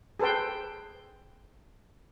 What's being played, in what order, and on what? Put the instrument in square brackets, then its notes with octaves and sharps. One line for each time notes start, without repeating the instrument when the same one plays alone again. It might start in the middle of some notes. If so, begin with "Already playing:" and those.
[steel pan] G#4 A4 B4 C5 G5